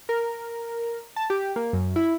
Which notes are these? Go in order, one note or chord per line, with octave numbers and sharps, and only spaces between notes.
A#4
A5
G4
A#3
F#2
E4